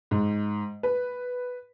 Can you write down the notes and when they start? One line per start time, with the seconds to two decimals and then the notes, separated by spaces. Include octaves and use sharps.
0.11 G#2
0.83 B4